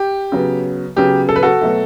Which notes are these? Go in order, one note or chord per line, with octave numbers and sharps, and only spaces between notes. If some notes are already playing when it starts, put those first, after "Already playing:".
Already playing: G4
C#3 F#3 B3
C#3 F#3 B3 G4
A4
B4
F#4 A4
B2 F#3 A3